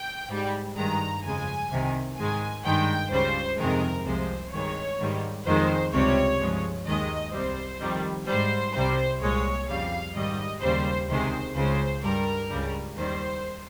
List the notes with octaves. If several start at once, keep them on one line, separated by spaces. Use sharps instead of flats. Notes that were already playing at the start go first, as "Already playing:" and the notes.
Already playing: G5
G#2 G3
G2 D#3 G#3 A#5
F2 C#3 G#3 G#5
C2 C3 D#3
G#2 D#3 G#3 G#5
G2 D#3 G#3 G5
C#2 C#3 G3 C5
F2 C3 D#3 G#3 A#4
C2 C3 F3 G#3 C5
G2 D#3 G#3 C#5
G#2 D#3 G3
F2 D#3 G#3 C5
C#2 C3 G3 C#5
G2 F3 G#3
D#2 D#3 G#3 D#5
C2 C3 G3 C5
F2 D#3 G3
G#2 G3 C5
C2 C3 G3 C5
C2 A#2 G#3 C#5
F2 C#3 G3 F5
G#2 D#3 G3 D#5
D#2 C#3 G3 C5
C#2 C3 D#3 G#3 C5
C#2 C#3 G#3 C5
G2 G3 A#4
C#2 C#3 G3
D#2 D#3 G3 C5